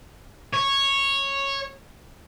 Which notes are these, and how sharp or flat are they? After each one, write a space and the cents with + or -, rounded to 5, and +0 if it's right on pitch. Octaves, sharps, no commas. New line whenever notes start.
C#5 -10